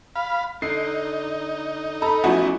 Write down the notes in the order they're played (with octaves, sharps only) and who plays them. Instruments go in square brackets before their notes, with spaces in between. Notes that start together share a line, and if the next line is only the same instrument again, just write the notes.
[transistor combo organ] F5 B5
[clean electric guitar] D3 [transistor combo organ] D#4 [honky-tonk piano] C7
[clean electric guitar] A4 [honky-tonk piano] A#5 B5
[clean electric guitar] E2 A2 C#4 [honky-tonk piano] F3 E4 F#4